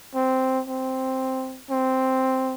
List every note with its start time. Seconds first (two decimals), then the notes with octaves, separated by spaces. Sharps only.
0.15 C4
0.67 C4
1.70 C4